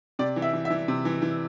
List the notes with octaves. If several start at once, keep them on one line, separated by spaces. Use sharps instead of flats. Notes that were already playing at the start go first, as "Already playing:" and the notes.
C3 D5
E3
E5
E3
E5
E3
C3
E3
E3